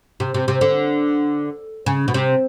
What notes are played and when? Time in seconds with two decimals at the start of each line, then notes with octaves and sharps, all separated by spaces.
0.20 C3
0.34 C3
0.48 C3
0.61 D3
1.86 C#3
2.08 B2
2.14 C3